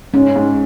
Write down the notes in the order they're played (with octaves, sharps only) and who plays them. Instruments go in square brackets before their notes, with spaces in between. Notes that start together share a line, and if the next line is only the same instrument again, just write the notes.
[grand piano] G#2 [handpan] C#4
[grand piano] G#2